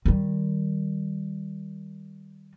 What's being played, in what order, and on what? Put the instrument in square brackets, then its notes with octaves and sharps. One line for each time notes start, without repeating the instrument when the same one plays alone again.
[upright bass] D#3 G3